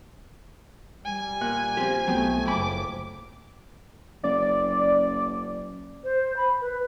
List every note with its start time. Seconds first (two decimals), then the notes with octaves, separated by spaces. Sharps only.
1.05 G3 G#5
1.41 A#2 F#6
1.77 F3 C4 G4
2.08 B1 F#3 A3 B3 C4 G5
2.48 F#1 A4 B5 D6
4.24 F#1 D5
6.04 C5
6.37 B5
6.61 B4